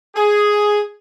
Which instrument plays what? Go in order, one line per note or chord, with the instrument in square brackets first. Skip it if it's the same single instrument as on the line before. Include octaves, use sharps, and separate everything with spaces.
[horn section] G#4